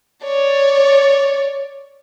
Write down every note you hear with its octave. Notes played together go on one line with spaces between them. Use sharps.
C#5 D5